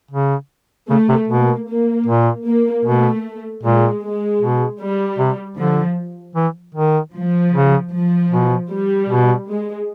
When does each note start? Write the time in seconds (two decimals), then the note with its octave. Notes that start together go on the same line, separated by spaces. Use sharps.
0.11 C#3
0.89 C#3 A3
1.09 C3
1.28 B2 A#3
1.68 A#3
2.06 A#2
2.45 A#3
2.85 B2 A3
3.62 A#2 G#3
4.02 G#3
4.41 B2
4.80 G3
5.19 C3
5.57 D3 F3
6.35 E3
6.75 D#3
7.14 F3
7.52 C#3
7.92 F3
8.31 B2
8.70 G3
9.09 B2
9.48 G#3